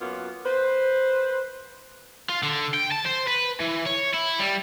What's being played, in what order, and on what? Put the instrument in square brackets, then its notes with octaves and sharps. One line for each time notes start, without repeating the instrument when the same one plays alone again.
[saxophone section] F#2 A#3 B3 F4
B4 C5
[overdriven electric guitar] F4
D3
G5
A5
C5
B4
E3
C#5
E4
G3